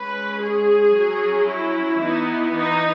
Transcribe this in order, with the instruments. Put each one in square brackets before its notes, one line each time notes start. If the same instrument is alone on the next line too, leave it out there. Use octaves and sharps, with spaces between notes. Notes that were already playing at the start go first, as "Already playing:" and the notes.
Already playing: [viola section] G#3 C#4 B4
G#4
F#3 C#4
E4
E3 B3 D#4
D#4